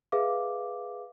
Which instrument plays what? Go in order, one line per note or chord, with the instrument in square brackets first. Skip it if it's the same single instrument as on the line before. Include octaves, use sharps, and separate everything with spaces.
[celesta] G#4 B4 E5 F5 D6